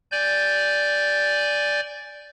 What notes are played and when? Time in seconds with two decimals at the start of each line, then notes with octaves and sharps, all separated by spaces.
0.11 D5 G#5 G6